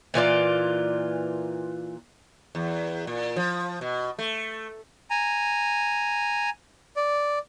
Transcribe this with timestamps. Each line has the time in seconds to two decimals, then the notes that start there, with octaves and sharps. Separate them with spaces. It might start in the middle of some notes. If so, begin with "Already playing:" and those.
0.14 A#2 E3 F4 D5
2.55 E2
3.07 A#2
3.36 F3
3.81 B2
4.19 A3
5.10 G#5 A#5
6.96 D5